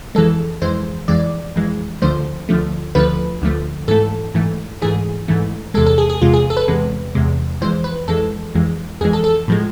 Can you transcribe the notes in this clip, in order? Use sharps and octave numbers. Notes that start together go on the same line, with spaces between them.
F2 E3 G#3 A4
F2 E3 G#3 C5
F2 E3 G#3 D5
F2 E3 G#3
D2 D3 F3 A3 C5
D2 D3 F3 A3
D2 D3 F3 A3 B4
D2 D3 F3 A3
G#2 E3 A3 A4
G#2 E3 A3
G#2 E3 A3 G#4
G#2 E3 A3
E2 C3 G#3 A4
A4
G#4
G#4
E2 C3 G#3 F4
G#4
A4
B4
E2 C3 G#3
E2 C3 G#3
F2 E3 G#3 C5
B4
F2 E3 G#3 A4
F2 E3 G#3
F2 E3 G#3 G#4
A4
A4
A2 F3 G#3